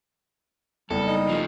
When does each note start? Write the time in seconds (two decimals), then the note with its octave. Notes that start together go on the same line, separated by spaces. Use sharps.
0.90 F#1 G3 B3 A4
1.07 D#4
1.29 F3 A3